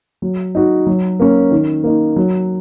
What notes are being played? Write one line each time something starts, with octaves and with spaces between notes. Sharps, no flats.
F#3
D#4 F#4
F#3
A#3 C#4
D#3
A#3 D#4
F#3